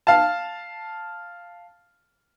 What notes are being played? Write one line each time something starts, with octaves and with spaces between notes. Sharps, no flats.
F5 A5